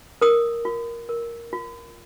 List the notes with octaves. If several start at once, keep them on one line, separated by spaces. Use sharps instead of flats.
A#4 D#6
F4
A#4
F4